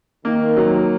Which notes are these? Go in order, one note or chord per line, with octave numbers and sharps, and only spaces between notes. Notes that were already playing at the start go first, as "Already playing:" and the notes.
D#3 A#3
F#3